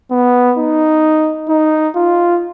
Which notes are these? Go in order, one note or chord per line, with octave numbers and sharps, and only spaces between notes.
B3
D#4
D#4
F4